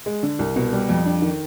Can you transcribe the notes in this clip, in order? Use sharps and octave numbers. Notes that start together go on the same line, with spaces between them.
G#3
D3
C2
B2
G3
F2
D4
D#3